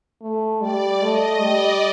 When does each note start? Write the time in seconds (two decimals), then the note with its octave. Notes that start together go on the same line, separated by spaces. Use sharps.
0.22 A3
0.61 G3 D5
1.02 A3 D#5
1.41 G3 D5